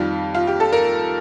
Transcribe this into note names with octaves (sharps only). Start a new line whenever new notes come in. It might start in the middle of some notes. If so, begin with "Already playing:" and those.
Already playing: F2 D#3 G3 F4
F4
G4
A4
A#4